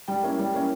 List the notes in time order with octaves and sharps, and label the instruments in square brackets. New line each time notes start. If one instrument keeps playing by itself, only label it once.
[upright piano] G3 [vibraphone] G5
[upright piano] A#3 C#4 E4
G3
A#3 C#4 E4